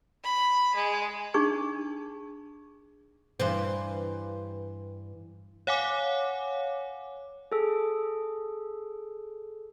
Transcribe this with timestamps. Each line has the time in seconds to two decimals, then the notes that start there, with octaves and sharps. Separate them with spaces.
0.24 B5
0.75 G#3
1.34 D4 D#4 G#4 C#6
3.40 G2 E3 C5
5.67 C#5 F5 F#5 G#5 D6
7.52 G#4 A4